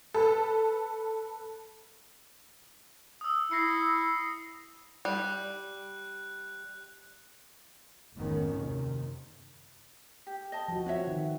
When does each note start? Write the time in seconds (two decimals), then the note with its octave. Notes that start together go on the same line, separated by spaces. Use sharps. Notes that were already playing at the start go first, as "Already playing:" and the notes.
0.14 A4 B4
3.21 D#6 E6
3.51 E4 A#6 C7 C#7
5.05 G3 F#6
8.14 F1 G#2 D#3 B3 C#4
8.51 F#1 D#2 C3 D#3
10.27 G4
10.52 D#5 A5
10.68 F3 F#4
10.86 C4 B4 C#5 E5
11.07 D#3